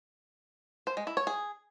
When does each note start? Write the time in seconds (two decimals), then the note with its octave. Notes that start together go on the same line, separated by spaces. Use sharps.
0.87 C5
0.97 G#3
1.07 E4
1.17 C#5
1.27 G#4